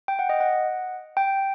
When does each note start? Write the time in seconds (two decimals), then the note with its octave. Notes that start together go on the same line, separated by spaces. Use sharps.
0.08 G5
0.19 F#5
0.29 D#5
0.40 F#5
1.17 G5